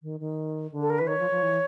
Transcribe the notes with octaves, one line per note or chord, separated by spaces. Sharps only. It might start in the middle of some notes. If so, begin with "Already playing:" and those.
D#3
D#3
D3
A4
A#4
E3 B4
D#3 C#5
F3
F3
E3